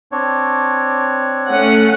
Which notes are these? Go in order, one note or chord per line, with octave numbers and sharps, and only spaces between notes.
C4 D4 C#5
A3 C#4 F#5